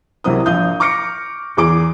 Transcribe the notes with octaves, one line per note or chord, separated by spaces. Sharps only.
C2 C3 F#3 E4 A#4 D#6
A#1 F5 D#6 G6
C#6 D6 F6 A#6 C#7 D7
E2 G#4 D6 D7